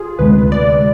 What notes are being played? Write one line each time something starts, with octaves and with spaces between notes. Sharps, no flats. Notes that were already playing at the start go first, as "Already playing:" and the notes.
Already playing: F4 G#4
D2 C3 G#3 B4
D5